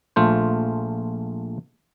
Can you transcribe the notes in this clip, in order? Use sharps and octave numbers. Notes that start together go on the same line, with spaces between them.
A#1 A3 F4 C5